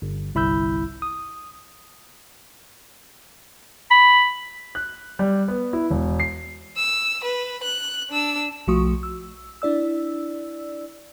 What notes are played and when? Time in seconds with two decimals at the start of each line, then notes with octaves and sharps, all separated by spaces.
0.02 G1
0.35 G1 C2 E4 B5 E6 G6
1.02 D#6
3.91 B5
4.75 F#6
5.19 G3
5.48 B3
5.73 E4
5.90 E1
6.20 C7
6.77 E6
7.24 B4
7.63 F#6
8.10 D4 E6
8.67 B1 F3 A3 F#4 C#6 D#6
9.03 E6
9.62 D4 E4 D5 E6